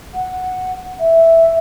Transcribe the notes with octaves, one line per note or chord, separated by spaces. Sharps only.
F#5
E5